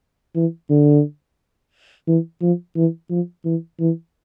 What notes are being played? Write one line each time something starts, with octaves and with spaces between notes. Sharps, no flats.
E3
D3
E3
F3
E3
F3
E3
E3